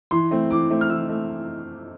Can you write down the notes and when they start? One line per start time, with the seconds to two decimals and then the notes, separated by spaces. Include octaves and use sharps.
0.11 E3 C6
0.31 A3 C4
0.51 E3 D6
0.70 A3 C4
0.81 F6
0.89 E3 E6
1.09 A3